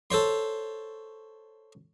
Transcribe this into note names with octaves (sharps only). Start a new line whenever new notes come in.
A4 C5 C#5 C6